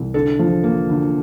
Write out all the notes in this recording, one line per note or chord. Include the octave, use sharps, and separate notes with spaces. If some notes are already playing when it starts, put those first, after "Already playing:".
Already playing: C2
D3 A4
F3
A#3
D2